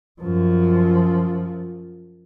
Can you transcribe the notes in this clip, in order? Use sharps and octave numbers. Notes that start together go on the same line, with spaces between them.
F#2 F3